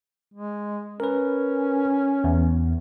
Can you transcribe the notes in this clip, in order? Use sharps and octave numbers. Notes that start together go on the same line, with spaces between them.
G#3
C#4 A#4 B4
E2